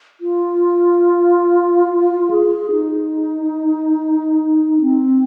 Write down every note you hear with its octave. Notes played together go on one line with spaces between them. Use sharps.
F4
G#4
D#4
C4